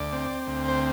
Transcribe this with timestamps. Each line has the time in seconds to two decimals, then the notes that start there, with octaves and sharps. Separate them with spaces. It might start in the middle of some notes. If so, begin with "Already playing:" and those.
Already playing: D2 D5
0.13 C4
0.47 D2
0.68 C5